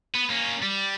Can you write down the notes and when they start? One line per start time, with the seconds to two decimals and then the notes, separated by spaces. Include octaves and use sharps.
0.15 B3
0.30 A#3 C#4
0.63 G3